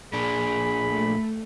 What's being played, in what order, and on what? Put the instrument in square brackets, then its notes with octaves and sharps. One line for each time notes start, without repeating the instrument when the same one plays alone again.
[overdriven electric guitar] A#2 D4 [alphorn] G#4 [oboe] B5
[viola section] A3